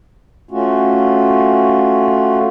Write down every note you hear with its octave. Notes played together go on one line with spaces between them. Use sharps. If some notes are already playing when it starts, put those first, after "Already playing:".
A3 C#4 F4 F#4